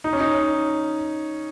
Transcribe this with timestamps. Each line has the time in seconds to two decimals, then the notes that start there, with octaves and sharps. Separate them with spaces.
0.04 D#4
0.13 C#4
0.20 D#4